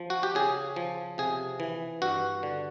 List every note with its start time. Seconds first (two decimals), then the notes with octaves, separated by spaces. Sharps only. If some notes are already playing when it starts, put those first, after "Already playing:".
Already playing: F3
0.10 F#4
0.23 G4
0.35 C#3 G#4
0.76 F3
1.18 C3 G#4
1.60 E3
2.02 G2 F#4
2.43 D3